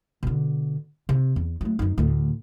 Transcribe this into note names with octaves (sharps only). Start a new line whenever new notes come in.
B2 D3
C3
E2
F#3 A3
F#2 D#4
D2 A2